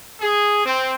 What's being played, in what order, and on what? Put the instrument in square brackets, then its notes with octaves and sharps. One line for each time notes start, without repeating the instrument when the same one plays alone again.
[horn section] G#4
C4